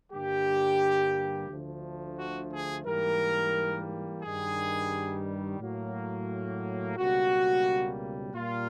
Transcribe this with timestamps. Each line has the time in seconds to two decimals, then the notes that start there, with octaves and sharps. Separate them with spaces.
0.12 G2 D3 G3 A#3 G4
1.49 D2 D3 F3 A3
2.18 F#4
2.52 G#4
2.86 G#2 E3 G3 A#3 A#4
4.23 G2 D#3 G3 G#4
5.60 A2 F#3 A#3
6.97 C#2 B2 G3 A#3 F#4
8.34 A#2 G3 A#3 F4